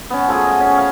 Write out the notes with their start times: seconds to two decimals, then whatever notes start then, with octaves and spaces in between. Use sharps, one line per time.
0.10 B3 C#4
0.28 F3 A3 F#4 G#4
0.44 D#5
0.60 C#4
0.78 F5